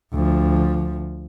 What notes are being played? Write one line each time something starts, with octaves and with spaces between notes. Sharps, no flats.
D2 F3